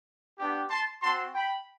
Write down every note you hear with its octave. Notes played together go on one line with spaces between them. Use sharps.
B3 D4 G4
A5 C6
C4 F#4 A5 C6
G5 B5